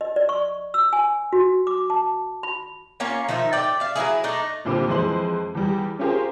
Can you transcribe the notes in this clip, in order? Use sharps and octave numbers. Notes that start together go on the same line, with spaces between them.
D#5
D5
C#6
E6
G#5
F#4
D6
A5
B5
A#3 C#4 F4 C#5
D#3 F3 D#4 E5
A2 D5 G5
E5 F5
F#3 A#3 E4 G#4
A3 D4 D#4
C2 A#2 D3 C4 G4 B5
F2 E3 G#3 C5 C6 F#7
E2 G3
C#4 F4 G4 G#4 A#4 C5